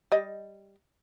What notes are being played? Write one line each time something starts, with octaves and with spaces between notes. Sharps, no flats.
G3 D#5